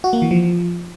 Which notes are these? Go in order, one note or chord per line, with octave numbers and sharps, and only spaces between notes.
F#4
A#3
E3
F3